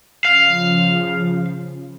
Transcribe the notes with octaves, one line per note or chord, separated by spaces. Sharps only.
C#3 F3 F5